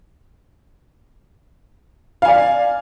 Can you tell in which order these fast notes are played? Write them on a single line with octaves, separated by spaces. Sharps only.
F5 G#5 D5